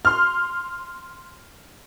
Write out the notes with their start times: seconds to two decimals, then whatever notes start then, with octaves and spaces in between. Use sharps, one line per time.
0.05 C6 F6